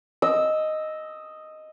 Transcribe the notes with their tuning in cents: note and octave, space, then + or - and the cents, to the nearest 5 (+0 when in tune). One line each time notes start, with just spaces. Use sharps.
D#5 +0 E6 -10